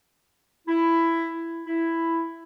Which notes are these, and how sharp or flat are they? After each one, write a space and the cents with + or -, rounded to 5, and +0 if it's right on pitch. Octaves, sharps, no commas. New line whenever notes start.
E4 +10
E4 +5